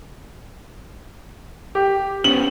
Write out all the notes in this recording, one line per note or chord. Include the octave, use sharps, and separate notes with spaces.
G4
B3 C#4 F#7